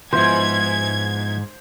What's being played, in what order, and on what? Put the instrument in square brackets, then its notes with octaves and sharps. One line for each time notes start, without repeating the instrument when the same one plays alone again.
[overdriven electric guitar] C#2 G#2 [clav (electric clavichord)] F3 B3 E4 [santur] C5 [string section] G#6